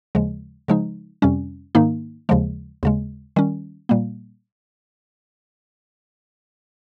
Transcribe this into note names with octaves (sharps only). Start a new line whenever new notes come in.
D#2 C#3 F3 G#3
C#3 F3 G#3 D#4
F2 C3 G3 C#4
G#2 D#3 A#3 D#4
D#2 C#3 F3 G#3
D#2 C#3 G#3
D#3 G3 C#4
A#2 G3 A#3